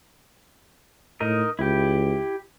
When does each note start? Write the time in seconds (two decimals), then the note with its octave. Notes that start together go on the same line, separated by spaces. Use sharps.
1.20 A2 D#4 A#4 D#5
1.59 C#2 E4 G4